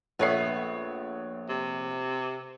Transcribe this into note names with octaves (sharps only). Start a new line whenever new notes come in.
A#1 A3 B3 C#5 C7
C3